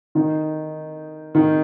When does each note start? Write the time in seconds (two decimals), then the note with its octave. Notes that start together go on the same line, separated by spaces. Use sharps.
0.15 D#3 D#4
1.35 D#3 D#4